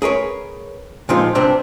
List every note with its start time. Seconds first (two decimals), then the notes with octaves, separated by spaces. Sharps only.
0.02 G#4 A#4 B4 C#5
1.09 A#2 F3 G3 G#3 D#4 F4
1.35 G2 C3 C4 D4 A#5